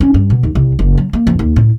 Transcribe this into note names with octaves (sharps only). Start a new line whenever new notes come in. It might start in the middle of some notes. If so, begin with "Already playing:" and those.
C#4
G2
B2
D#2
C2
F#1
F#3
A#3
F2
D#2
A2